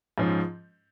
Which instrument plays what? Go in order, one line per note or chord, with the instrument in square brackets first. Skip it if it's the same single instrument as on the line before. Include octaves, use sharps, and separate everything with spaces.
[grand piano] G#2 F3 C#4